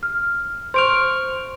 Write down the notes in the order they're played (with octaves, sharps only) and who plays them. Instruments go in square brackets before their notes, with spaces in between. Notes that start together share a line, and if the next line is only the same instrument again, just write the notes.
[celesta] F6
[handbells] C5 C#6 F6 [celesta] C6 D7 F7